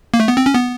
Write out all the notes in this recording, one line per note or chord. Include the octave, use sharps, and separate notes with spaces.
A#3
A3
B3
C4
C#4
B3